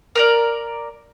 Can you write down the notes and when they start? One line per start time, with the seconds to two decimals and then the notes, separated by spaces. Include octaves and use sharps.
0.15 A#4 B4 D5